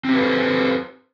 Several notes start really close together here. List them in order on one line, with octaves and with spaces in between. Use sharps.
C4 G4 B4 A4 C5